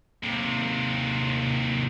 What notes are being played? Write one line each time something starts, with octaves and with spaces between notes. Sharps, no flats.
D#2 C3